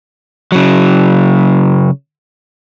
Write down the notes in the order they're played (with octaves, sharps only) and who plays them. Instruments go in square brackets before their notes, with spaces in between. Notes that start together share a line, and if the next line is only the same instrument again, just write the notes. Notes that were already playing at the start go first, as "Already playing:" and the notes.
[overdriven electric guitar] C#3 F#3